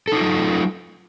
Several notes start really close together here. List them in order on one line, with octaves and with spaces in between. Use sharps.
A4 D#4 F4 F#3